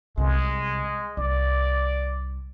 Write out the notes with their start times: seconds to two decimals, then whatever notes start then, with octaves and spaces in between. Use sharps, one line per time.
0.17 C2 C3 G#3
1.17 C2 D5